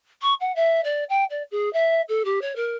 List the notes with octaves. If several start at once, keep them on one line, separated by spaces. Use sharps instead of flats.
C#6
F#5
E5
D5
G5
D5
G#4
E5
A4
G4
C#5
A#4